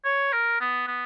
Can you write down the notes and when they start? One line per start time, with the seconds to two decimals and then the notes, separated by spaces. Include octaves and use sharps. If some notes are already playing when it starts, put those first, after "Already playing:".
0.05 C#5
0.32 A#4
0.61 B3
0.88 B3